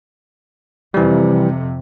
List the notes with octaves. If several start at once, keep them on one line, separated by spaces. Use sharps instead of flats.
F2 C3 E3 G3